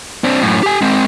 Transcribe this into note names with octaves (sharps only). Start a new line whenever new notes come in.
C4 D4
F#2 A2
G4 G#5
G#3 C4